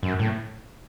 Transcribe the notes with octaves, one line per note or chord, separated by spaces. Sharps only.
F#2
A2